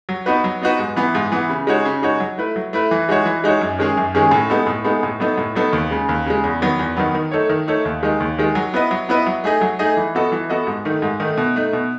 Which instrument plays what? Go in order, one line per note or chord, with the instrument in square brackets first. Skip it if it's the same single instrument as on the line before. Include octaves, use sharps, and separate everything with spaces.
[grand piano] F#3
B3 D#4 F#4 B4
F#3
B3 D#4 F#4 B4
G#2
E3 B3
G#2
E3 B3
C#3
G#3 D#4 F#4 C#5
C#3
G#3 D#4 F#4 C#5
F#3
A3 E4 B4
F#3
A3 E4 B4
E3
G#3 D#4 F#4 C#5
E3
G#3 D#4 F#4 C#5
F#2
D#3 G#3 C#4 G#4
F#2
D#3 G#3 C#4 G#4
A2
G#3 B3 D#4 A4
A2
G#3 B3 D#4 A4
A2
F#3 B3 D#4 A4
A2
F#3 B3 D#4 A4
D#2
C#3 G#3
D#2
C#3 G#3
E2
D#3 F#3 B3
E2
D#3 F#3 B3
D#3
A3 D#4 A4 C#5
D#3
A3 D#4 A4 C#5
D#2
D#3 G#3 D#4
D#2
D#3 G#3 D#4
F#3
B3 E4 B4 D#5
F#3
B3 E4 B4 D#5
F#3
A3 D#4 G#4 D#5
F#3
A3 D#4 G#4 D#5
E3
B3 F#4 A4 D#5
E3
B3 F#4 A4 D#5
G#2
D#3 A3 D#4
G#2
D#3 A3 D#4
B2
A3 D#4
B2